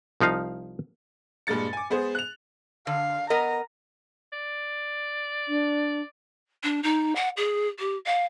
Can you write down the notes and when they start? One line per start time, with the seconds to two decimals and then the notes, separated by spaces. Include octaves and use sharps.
0.20 C2 F3 D#4 F5
1.47 G2 A#2 G#3 A6 C#7
1.73 G#5 D6
1.90 G#3 B3 G#4 C5
2.15 F#6 F7
2.87 D3 F5
3.30 B3 A#4 D#5 A#5
4.32 D5
5.48 D4
6.63 D4
6.83 D#4
7.16 F#5
7.37 G#4
7.79 G4
8.06 F5